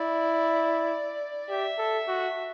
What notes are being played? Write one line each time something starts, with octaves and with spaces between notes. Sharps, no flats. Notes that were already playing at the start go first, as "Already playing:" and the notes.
Already playing: E4 D5
G4 E5
A4
F#4